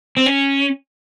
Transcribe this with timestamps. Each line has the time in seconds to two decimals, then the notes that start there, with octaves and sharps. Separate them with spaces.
0.17 C4
0.26 C#4